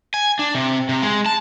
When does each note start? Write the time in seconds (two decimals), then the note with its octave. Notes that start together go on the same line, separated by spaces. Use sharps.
0.14 G#5
0.39 D4
0.55 C3
0.89 C3
1.03 G#3
1.26 A5